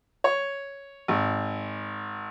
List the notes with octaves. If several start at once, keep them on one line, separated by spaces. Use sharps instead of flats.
C#5
G#1